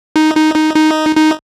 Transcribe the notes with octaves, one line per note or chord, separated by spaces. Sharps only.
D#4
D#4
D#4
D#4
D#4